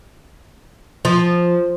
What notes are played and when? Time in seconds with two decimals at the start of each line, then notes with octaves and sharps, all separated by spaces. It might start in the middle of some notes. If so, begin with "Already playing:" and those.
1.05 F3